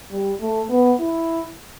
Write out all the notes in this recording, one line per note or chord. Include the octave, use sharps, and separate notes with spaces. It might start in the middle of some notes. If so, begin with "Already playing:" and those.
G3
A3
B3
E4